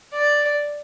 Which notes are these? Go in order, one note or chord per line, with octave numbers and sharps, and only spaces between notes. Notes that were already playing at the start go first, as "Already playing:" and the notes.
D5